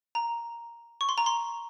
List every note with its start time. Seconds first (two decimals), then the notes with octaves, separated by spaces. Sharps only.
0.15 A#5
1.01 C#6
1.09 C6
1.18 A#5
1.26 C6